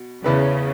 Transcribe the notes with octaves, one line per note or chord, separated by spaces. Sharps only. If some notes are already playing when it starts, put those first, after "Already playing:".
Already playing: B2
E2 C#3 E3 B3 E4 B4